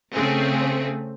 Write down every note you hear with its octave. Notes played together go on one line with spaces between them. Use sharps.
C#3 A3 C4 G#4